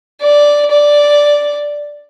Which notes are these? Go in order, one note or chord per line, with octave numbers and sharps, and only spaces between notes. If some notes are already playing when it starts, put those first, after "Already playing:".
D5
D5